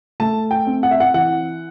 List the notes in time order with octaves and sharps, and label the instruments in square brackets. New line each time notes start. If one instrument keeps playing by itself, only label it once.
[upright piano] A3 A5
G5
C4
F#5
E5
F#5
E3 F#5